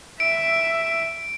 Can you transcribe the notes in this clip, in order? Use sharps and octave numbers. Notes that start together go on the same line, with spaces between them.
E5 D7